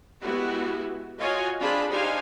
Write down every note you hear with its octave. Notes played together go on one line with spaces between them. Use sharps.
G#3 B3 E4 F#4 G4
F4 F#4 C#5 D#5 F5 G#5
C4 D4 F4 G#4 A5 B5
D4 D#4 G4 C5 F5 G#5